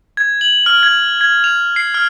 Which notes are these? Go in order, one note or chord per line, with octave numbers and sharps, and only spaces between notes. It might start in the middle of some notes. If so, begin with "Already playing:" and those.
G#6
F#7
F6
G#6
G#6
F7
C7
F6